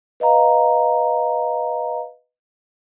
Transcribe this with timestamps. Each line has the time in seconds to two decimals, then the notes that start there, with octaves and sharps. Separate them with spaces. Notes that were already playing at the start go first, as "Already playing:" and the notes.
0.20 B4 D#5 F5 A#5